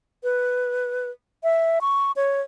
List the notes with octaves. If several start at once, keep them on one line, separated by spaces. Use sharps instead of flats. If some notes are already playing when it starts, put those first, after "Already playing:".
B4
E5
C#6
C#5